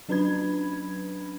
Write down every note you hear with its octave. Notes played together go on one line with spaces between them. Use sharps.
F#3 C#4 D4 B4 B5 G#6